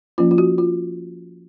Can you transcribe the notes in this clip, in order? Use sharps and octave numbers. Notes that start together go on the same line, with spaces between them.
F3 A#3 C#4 F4
F4
F#4
F4